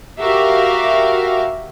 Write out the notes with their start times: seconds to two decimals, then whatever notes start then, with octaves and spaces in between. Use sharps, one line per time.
0.18 F#4 G4 A#4 E5 F5